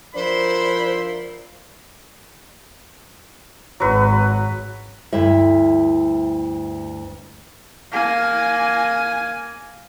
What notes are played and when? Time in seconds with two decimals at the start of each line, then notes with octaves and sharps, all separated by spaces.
0.15 F3 D4 E4 F4 A#4 C5 B5 C6
3.80 G#1 F#3 B4
5.13 D2 G2 E4 E5
7.92 A#3 G#5